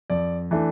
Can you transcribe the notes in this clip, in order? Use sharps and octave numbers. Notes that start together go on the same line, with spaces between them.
F2 D5
E3 A3 D4